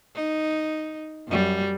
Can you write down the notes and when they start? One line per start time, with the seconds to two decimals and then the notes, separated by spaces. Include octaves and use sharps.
0.16 D#4
1.28 F#2 G3